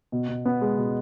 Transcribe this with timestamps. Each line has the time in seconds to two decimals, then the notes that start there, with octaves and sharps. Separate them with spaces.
0.12 B2
0.28 B2
0.45 B3
0.61 G#3
0.78 B2